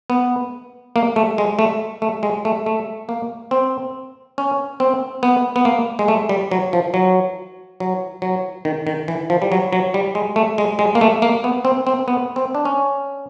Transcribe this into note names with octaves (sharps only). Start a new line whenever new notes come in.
B3
A#3
A3
G#3
A3
A3
G#3
A3
A3
A#3
C4
C#4
C4
B3
B3
A#3
G#3
A3
G3
F#3
F3
F#3
F#3
F#3
D#3
D#3
E3
F3
G3
F#3
F#3
G3
G#3
A3
G#3
G#3
A#3
A3
A#3
B3
C4
C4
B3
C4
D4
C#4